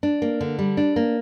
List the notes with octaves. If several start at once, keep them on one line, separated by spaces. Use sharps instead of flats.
D4
A#3
D3
G3
D4
A#3